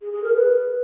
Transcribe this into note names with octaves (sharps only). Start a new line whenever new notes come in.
G#4
G#4
A#4
B4